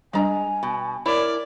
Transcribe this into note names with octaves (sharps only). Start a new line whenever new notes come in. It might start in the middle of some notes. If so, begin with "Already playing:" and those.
G3 G#3 D4 D#5 G#5 A#5
B2
E4 A#4 C#5 D5